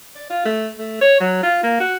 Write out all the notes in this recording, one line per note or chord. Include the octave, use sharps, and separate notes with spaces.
D5
F4
A3
A3
C#5
F#3
F4
A#3
F#4